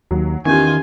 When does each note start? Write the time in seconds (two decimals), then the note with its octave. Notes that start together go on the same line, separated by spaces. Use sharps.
0.11 D#2 F#3
0.45 E2 D#3 C#4 F4 G4 G#5